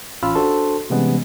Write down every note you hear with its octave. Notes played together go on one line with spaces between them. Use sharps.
A1 C#4 F4 B5 E6 F6
D4 F#4 A4 C5 A5 C6
C3 E3 G3 G#3 B3 C#4